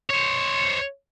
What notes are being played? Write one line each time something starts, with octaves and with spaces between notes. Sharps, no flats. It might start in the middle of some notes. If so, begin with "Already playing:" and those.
C5 C#5